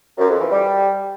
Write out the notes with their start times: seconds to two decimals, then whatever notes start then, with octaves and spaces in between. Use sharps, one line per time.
0.17 F#2
0.28 F2
0.39 E3
0.50 G3